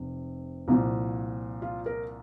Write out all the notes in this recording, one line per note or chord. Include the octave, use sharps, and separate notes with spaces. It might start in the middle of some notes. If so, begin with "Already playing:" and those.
Already playing: F1 C3
C2 A#2 F3
F4
A#4